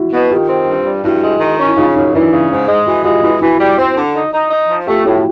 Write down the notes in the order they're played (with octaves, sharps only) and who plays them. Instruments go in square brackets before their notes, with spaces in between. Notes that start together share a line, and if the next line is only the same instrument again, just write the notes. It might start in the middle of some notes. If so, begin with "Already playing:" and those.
Already playing: [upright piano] E4 F#4
[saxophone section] B2
[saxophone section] D#3 [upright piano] F4 G4
[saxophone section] C4
G2
G3
[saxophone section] G2 [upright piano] E4 F#4
[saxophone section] G#3
D#3
C#4
[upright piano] E4
[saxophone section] C#3 [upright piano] D#4 F4
[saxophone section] F#2 [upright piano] C#4 D#4
[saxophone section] E3 [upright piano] D4 E4
[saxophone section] C#3
G#2
G#3
[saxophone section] E3 [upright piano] E4 F#4
[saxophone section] G#3 [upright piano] F4 G4
[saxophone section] E3 [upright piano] E4 F#4
[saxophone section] E3 [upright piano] E4 F#4
[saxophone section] G3
C4
D3
D#4
D#4
D#4
F3
[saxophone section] A3 [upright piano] F4 G4
[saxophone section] A2 [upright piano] E4 F#4